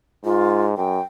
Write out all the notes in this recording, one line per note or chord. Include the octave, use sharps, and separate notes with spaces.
G#2 F4
F#2 G5